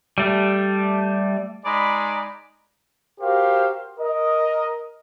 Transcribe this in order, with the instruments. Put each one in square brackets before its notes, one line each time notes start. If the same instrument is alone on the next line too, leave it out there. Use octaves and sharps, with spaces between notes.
[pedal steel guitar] G3 A3
[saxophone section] G#3 D#4 D5 [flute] B5
[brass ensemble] F#4 G4 A#4 C5 F5
A#4 D#5